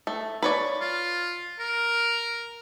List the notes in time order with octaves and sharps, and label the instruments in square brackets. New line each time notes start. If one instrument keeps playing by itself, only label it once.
[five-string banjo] A3
B4 C#5 D5
[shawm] F4
A#4